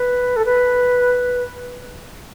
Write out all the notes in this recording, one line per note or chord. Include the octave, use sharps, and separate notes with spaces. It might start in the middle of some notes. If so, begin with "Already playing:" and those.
Already playing: B4
A4
B4